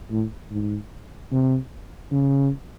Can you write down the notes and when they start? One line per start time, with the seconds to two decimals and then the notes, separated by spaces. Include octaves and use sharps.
0.11 A2
0.51 G#2
1.32 C3
2.12 C#3